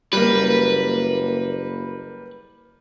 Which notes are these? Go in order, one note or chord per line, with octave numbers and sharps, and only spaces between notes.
F#1 G3 A#3 B4